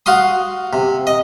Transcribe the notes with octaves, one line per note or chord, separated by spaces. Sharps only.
F#4 F5 C6 D#6
C3
D#5